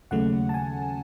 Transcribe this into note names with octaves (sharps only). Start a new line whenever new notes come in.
D#2 C#3 F#3 A3 F#5
A5
G#5